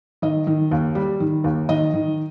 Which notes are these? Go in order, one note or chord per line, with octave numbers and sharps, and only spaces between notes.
D#3 D#5
D#3
D#2
G3
D#3
D#2
D#3 D#5
D#3